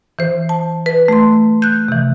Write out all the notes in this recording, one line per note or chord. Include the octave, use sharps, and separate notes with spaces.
E3 C5
A5
B4
A3 C6
F#6 G6
C3 E3